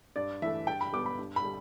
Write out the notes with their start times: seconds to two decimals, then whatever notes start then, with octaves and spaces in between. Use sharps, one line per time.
0.16 G2 D5
0.42 E3 A3 E5
0.67 G2 G5
0.81 B5
0.93 G3 B3 D6
1.06 B5
1.18 G2
1.36 B5
1.44 G3